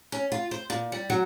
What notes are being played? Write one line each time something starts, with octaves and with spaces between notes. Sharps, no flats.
C#4
F4
C5
A#2
G3
F#3